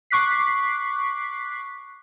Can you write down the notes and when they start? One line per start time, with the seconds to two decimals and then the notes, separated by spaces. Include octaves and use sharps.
0.10 C#6 D6 F#6 B6 C7